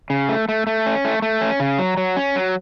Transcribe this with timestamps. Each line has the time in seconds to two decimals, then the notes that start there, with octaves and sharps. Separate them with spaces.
0.10 C#3
0.29 A3
0.49 A3
0.67 A3
0.86 C#4
1.05 A3
1.22 A3
1.41 C#4
1.60 C#3
1.79 F#3
1.97 F#3
2.17 C#4
2.36 F#3